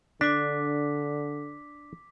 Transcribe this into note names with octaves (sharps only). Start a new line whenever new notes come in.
D3 D4 D6 B6